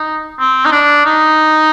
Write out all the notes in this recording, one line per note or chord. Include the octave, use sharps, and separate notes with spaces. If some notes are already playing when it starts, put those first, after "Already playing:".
Already playing: D#4
C4
D#4
D4
D#4